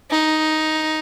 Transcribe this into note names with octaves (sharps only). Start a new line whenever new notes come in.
D#4